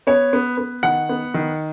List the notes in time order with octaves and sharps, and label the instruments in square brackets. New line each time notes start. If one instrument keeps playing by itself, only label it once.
[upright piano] B3 C#5
B3
B3
D#3 F#5
B3
D#3